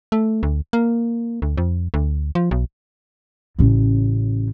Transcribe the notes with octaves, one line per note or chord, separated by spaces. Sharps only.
A3
D2
A#3
D2
F2
D2
F3
B1
A1 C#3